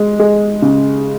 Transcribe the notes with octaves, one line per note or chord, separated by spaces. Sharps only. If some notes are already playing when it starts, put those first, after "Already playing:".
Already playing: G#3
G#3
C#3